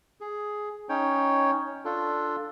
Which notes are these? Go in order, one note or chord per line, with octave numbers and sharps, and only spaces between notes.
G#4
C#4 D#4 C#5 G5
D4 F4 A4